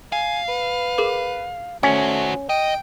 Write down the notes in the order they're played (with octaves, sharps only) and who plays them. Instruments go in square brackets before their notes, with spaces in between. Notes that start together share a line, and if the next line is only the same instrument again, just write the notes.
[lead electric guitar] F5 [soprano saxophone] G#5
[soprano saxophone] B4
[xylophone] G#4 A#4 D6
[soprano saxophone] A3 [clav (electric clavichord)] C#4 [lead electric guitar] F#4 C5 [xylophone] G#5
[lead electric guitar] D#5 [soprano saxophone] G5